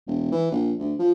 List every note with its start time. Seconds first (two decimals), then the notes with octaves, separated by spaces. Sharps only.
0.07 E1
0.32 E3
0.52 A#1
0.79 D2
0.99 F3